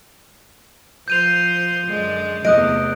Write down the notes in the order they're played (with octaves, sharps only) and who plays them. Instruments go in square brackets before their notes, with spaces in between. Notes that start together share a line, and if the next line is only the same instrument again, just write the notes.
[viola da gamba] F3 C5 [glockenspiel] G6 D#7 F7
[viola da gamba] F#2 D3 G#3
[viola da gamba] E2 C3 A3 [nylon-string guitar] D#5 [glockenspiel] D#6 F#6 D7